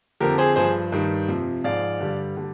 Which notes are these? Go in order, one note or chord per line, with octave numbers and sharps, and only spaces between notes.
F2 D3 F3 G4 A#4
G#4 C5
G2 F3 G#4 C5
G2 D#3 G3
F2 C3 F3
G#2 F3 D5 F5
G2 D3 G3
D3 G3